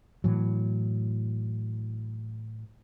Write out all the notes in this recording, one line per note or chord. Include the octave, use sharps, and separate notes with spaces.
A2 E3 F#3